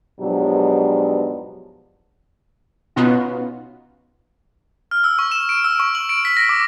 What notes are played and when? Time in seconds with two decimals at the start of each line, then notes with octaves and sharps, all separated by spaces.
0.21 G#2 B2 F3 F#3 D4 G4
2.96 B2 B3 C#4 D#4 F4 F#4
4.91 F6
5.04 E6
5.19 C#6
5.32 E7
5.49 D7
5.64 E6
5.80 C#6
5.95 F#7
6.09 D7
6.25 B6
6.37 A#6
6.49 D6